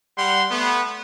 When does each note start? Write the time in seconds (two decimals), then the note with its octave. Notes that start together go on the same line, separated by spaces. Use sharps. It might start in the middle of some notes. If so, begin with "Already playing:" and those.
0.17 G3 F#5 C6
0.50 A3 B3